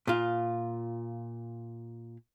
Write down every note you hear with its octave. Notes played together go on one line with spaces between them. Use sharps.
A#2 F4